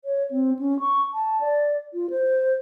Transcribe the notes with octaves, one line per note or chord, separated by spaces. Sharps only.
C#5
C4
C#4
C#6
A5
D5
F4
C5